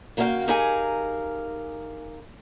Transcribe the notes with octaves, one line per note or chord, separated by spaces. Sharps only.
C#3 A#3 F#4 A#4 F5 G5
D#4 G4 G#4 A#4 F5 G#5